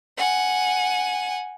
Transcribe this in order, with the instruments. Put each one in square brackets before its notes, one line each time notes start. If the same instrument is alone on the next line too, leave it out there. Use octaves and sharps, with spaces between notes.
[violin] F#5 G#5